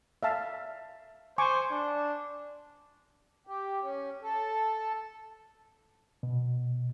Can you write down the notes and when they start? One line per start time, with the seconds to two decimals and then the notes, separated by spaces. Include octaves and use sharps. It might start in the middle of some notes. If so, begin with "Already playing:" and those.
0.23 E5 F5 A5
1.38 C5 G#5 C#6 D6
1.71 D4
3.47 G4
3.82 C#4
4.22 A4
6.23 B2